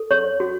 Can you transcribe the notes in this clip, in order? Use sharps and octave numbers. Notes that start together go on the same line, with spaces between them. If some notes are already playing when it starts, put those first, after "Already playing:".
Already playing: A4
C#5
F#4